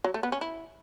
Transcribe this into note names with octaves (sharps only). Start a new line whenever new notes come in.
F#3
A3
B3
C#4
E4